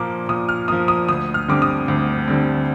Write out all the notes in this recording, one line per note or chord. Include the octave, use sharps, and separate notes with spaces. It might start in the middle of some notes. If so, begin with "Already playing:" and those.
Already playing: A#2 F3 A#3 D6
A#2 D#6
F6
F3 A#3 D#6
D#6
D2 D#6
F6
D3 G3 C4 D6
D#6
D2
D3 G3 C4